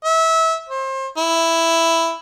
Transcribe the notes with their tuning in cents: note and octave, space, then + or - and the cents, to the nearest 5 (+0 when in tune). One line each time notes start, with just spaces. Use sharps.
E5 -25
C5 +30
E4 +5